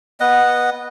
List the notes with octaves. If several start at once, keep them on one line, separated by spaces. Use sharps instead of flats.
B3 D#5 F#5